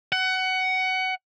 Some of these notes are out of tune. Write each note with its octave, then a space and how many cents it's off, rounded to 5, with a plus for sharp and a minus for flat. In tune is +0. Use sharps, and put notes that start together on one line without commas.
F#5 +20